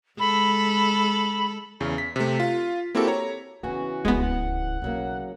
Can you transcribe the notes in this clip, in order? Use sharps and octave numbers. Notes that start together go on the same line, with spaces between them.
G#3 A4 B5
E2 C#3
B6
C3 A3
F4
A#3 C4 E4 F#4 G4 A4
C#5 A#5
C#3 E3 B3 C4 F#4 G#4
D1 C#2 G#3 B3
F#5
B1 C#3 E3 F#3 A#3